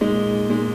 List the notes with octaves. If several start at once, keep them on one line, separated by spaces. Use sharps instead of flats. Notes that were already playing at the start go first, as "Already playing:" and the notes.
A#2 G#3 D#4
A#2 G#3 D#4